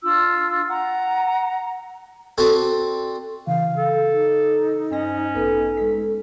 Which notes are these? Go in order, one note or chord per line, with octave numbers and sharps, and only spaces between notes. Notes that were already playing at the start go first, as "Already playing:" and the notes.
D4 F4 E6
F#5 A#5
C4 D4 F#4 A4
C#3 E3 F5
A4
D#4
G2 C#4 C5 D#5 A#6
A1 B3 A4 B4
G#3 B6